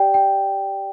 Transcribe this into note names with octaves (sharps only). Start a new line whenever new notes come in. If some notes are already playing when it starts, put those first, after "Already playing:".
Already playing: G4 D5 G5
G5